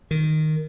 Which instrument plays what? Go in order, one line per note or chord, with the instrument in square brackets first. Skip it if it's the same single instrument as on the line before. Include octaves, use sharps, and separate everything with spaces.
[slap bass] D#3